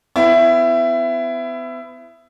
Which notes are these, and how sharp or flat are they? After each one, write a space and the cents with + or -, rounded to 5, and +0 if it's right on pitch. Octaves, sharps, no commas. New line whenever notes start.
B3 +40 E4 +20